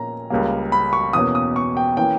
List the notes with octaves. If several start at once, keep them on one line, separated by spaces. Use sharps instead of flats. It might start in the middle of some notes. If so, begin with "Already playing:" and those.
Already playing: A#2 C#4 A#5
C#2 C#3 G3 A#3
B5
C#6
E2 B2 A#3 C#4 D#6
D#6
C#6
G5
E3 A#3 C#4 G5